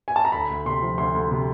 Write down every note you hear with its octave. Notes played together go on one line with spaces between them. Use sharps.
G#5
A5
A#5
D2 B5
D2
C3 C6
F3
D2 C6
D2
C3